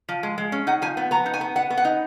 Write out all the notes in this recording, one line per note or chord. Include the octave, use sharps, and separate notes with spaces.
F3
G#3
G#3
C#4
D#4 F#5
F3 G#5
B3
B3 A#5
D#4
G#5
B3
B3 F#5
B3
F#5
D#4